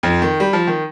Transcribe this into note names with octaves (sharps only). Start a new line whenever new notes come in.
F2 F3
D#3
G3
F3
D#3